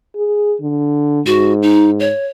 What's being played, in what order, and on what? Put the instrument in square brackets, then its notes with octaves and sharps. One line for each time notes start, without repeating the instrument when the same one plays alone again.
[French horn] G#4
D3
[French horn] G#2 [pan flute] F#4
[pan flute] D#4
C#5